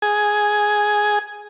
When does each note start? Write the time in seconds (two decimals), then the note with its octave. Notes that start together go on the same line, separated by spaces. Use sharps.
0.02 G#4